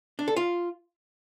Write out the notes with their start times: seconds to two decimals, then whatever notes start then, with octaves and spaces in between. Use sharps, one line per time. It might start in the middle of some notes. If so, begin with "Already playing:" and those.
0.19 D4
0.28 A4
0.36 F4